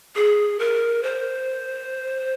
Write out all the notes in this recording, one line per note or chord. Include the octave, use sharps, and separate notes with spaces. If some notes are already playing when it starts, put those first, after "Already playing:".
G#4
A#4
C5